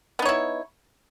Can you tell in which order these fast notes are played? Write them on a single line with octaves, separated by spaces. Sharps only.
B3 D#4 C#5 E4